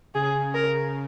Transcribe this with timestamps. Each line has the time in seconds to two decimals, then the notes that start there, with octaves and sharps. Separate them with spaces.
0.15 C#3 G#4
0.54 A#4